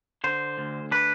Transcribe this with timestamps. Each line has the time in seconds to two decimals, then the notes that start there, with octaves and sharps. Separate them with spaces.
0.24 D3 C5
0.58 D2
0.91 D4 B4